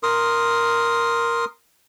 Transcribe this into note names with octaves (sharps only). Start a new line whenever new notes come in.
A#4 C6 D#6